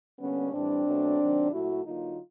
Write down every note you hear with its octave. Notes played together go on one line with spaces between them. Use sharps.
D3 G3 A#3 B3 C#4
A2 E3 G3 C4 D4
B2 F#3 A3
C3 D#3 F#3
A#2 F#3 A3 E4 F#4
D3 F#3 A#3 D#4 F4